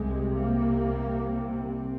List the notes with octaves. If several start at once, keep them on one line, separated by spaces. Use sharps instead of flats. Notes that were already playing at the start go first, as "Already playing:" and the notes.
Already playing: C2 C3 G#3
A#3
C4